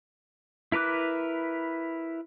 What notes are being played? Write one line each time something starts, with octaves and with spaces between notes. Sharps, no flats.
E4 A#4 B4 D6 F#6